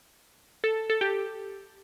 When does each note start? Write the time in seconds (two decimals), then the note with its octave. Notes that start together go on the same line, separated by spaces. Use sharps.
0.64 A4
0.90 A4
1.01 G4